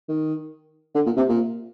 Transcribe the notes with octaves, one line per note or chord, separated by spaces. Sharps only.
D#3
D3
A#2
C3
A#2